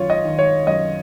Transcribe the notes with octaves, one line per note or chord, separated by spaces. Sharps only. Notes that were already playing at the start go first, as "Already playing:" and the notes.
Already playing: F#2 D#3 F4 C#5
D#5
D#3
C#5
F#2 D#5